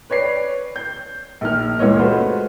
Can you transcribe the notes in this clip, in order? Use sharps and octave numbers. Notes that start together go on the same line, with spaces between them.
B4 C#5 D5 C7
G6
A#1 D#3 F6
F#1 C#2 A#2 E3 C#5 D#5
G#3 A3 F4 F#4 B4 C5